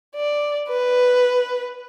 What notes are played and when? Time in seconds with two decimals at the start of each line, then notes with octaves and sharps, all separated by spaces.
0.16 D5
0.69 B4